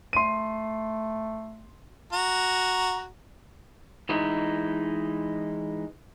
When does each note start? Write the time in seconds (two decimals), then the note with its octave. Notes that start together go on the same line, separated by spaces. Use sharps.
0.13 A3 C6 D#7
2.13 F#4 A#5
4.09 E3 G#3 D#4 E4